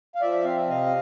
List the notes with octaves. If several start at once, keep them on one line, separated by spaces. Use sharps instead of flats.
F5
F3 D5 E5
C4 F5
E5
C3 D#5 F5